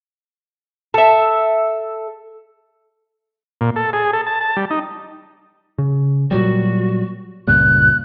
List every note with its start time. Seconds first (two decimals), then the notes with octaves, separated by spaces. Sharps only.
0.94 A4 E5
3.61 A#2
3.76 A4
3.93 G#4
4.13 A4
4.27 A5
4.41 A5
4.57 G3
4.71 D#4
5.78 C#3
6.31 A#2 F#3 G3 F#4
7.47 C#2 G2 A#2 F#6